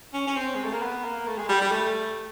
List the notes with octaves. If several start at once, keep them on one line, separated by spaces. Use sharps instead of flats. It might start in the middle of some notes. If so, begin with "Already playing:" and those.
C#4
C#4
C4
G#3
A3
A#3
B3
A#3
A3
G#3
G3
G3
A3